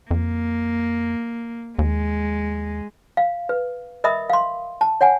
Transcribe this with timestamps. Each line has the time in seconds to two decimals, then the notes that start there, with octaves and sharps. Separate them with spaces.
0.11 F2 A#3
1.79 D#2 G#3
3.17 F5
3.49 B4
4.04 A#4 D#5 E5 B5 D#6
4.30 F5 C6
4.81 A5
5.01 C#5 F#5 G#5